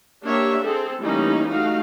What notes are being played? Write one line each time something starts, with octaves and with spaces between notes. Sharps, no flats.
A#3 D4 G4 C#5 E5
C4 G#4 A4
E3 G3 A3 A#3 C#4 D#4
A3 D#4 F#4 F5